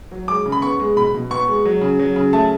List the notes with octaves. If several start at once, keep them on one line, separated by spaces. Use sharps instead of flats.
F#3
G#3 D6
C#3
B5
B3 C#6
G#3
B2 B5
B2
B3 C#6
G#3
F#3
C#3
F#3
C#3
A3 A5